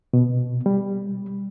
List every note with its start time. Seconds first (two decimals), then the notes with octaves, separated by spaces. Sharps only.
0.13 B2
0.66 G3